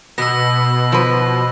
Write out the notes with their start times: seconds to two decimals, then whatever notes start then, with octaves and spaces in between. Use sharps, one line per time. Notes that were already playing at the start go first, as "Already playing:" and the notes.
0.18 B2 B3 E6 A#6
0.92 F3 B4